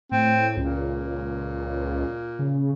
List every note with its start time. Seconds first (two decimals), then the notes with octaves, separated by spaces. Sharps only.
0.12 A2 C4
0.57 C#2 A#2
2.39 C#3